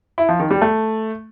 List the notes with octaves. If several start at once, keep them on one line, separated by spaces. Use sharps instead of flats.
E4
F3
D#3
G3
A3